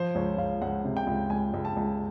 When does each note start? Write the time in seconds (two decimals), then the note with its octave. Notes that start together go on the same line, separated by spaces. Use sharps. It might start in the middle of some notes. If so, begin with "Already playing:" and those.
Already playing: F3 C5
0.15 C#2 C#5
0.38 C#2 F5
0.62 C#2 F#5
0.85 C3
0.97 G5
1.07 C#2
1.30 C#2 G#5
1.54 C#2
1.65 A5
1.77 C#2